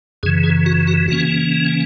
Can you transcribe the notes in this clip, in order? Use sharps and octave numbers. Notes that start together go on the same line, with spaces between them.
F#2 C#3 E3 G#4
G#4
F#4
F#4
C#3 E3 A#3 C#4 F#4